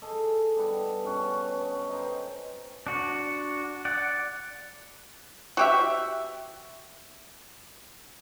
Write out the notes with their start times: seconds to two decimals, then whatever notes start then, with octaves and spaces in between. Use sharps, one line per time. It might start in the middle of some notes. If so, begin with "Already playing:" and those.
0.02 G#4 A4 D#5
0.56 G3 B3 D4
1.04 B2 C#4 F#4
1.59 B3
1.89 D#4 C5 G5
2.87 D4 F#4
3.85 D5 F#5
5.57 F#4 G4 E5